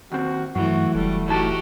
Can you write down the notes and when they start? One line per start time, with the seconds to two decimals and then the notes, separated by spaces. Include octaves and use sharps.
0.12 D#2 C4 F#4
0.55 G2 E3 F#3 A3 F#4
0.95 F1 G3 A3
1.28 A2 D#4 F#4 G4 A5